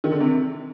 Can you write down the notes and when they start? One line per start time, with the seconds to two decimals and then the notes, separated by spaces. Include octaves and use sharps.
0.04 D#3
0.11 D3
0.20 C3